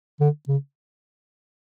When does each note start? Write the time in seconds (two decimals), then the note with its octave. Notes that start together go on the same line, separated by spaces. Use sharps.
0.20 D3
0.48 C#3